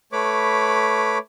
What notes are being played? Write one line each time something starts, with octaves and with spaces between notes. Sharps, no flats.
A3 B4 C#5 B5 D6